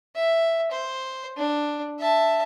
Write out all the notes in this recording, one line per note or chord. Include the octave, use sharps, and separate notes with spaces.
E5
C5
D4
E5 A5